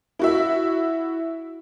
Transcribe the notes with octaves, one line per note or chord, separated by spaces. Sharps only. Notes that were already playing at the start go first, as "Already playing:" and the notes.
E4 F#4 E5